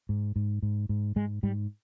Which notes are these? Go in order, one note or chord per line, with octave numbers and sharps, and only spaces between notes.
G#2
G#2
G#2
G#2
G#2 G#3
G#2 G3